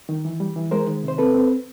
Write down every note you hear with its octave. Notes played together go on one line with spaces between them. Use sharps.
D#3
E3
G3
E3
G#3 A#4 C5
D#3
C3
C5
C4 A4 B4
C4